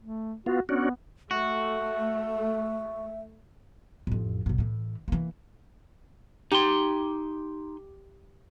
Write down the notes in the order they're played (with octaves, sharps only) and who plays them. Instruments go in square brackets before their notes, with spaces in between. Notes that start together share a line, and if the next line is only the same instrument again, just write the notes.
[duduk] A3
[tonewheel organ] B3 F4 [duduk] F#4
[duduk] B3 [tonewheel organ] C#4 D4 F#4
[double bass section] A3 [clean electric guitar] F#4 [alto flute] E5
[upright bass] A1 F2
B1 G2
A2 E3
E3 A#3
[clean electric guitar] D#4 C6 [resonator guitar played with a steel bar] G4